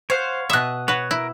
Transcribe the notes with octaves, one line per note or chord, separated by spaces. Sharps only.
C5 C#5 F5 F#5
B2 E5 D#6 F#6
F#4 B4 C#5
E4 A#4